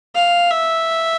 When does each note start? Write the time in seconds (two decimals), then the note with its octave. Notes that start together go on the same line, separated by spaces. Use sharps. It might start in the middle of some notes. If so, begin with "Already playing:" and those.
0.15 F5
0.51 E5